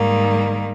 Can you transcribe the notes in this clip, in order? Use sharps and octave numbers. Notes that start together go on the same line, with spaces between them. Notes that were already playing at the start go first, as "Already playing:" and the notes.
Already playing: G#2 D#3 G3 A#3